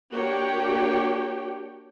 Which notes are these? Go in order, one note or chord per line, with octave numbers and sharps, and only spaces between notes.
A#3 D4 F#4 G4 C#5 G5